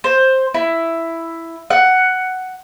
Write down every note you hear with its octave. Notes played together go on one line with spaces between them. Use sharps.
C5
E4
F#5